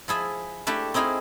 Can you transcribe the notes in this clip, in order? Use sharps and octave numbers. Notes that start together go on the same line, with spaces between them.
F3 E4 G#4 E5
A3 D4 E4 G4
C4 D#4 E4 G#4 F5